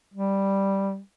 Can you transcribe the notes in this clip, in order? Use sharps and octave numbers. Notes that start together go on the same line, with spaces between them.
G3